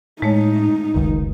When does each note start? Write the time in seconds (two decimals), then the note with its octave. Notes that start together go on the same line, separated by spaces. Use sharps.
0.22 A2 G#3 A3 D#4 C#5
0.56 C#4
0.95 F#1 C#2 D#3